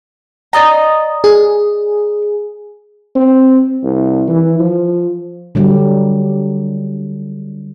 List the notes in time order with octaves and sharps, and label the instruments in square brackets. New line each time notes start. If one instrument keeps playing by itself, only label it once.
[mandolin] D5 D#5 A#5
[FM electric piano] G#4
[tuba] C4
C2
E3
F3
[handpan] D3 F#3 G3